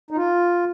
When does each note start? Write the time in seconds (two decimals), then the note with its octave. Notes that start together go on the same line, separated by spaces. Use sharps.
0.11 D#4
0.16 F4